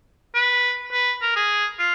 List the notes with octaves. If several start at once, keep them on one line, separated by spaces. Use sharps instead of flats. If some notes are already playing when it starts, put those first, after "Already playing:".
B4
B4
A#4
G#4
F4